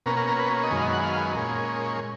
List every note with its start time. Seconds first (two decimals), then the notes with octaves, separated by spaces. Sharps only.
0.06 B2 A#3 C#4 A#4
0.17 A#4
0.28 A#4
0.39 B4
0.63 D#5
0.71 F#2 D#3 G#3 B3 C#5
0.77 F5
0.82 D#5
0.93 F#5
1.03 F5
1.35 A#2 G#3 C#4